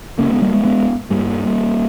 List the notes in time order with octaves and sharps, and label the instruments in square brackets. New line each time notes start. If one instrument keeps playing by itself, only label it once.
[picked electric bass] C#2 C#3 A#3 C#4
G#3 B3
G3 A#3
G#3 B3
G#3 B3
G2 G3 A#3